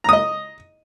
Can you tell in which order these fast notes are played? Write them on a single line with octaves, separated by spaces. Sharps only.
A#5 D#6 D#5